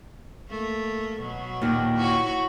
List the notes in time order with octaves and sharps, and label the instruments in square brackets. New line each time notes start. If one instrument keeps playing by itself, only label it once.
[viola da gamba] A3 A#3
B2 F#3
[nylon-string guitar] D#2 A#2 D#3
[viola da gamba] E4 F#4 C#5